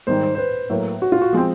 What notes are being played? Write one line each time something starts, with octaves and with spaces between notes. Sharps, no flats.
G#2 D#3 G3 C5
C5
C5
B4
A2 F#3 A#3
F#4
F4
F#4
F3 G#3 C4